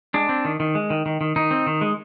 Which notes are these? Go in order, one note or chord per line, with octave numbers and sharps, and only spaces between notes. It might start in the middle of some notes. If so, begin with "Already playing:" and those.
G#3 D4
C4
D#3
D#3
G#3
D#3
D#3
D#3
D#3 D#4
C4
D#3
G#3